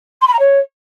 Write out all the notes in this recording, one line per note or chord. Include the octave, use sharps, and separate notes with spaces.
C6
B5
A#5
C#5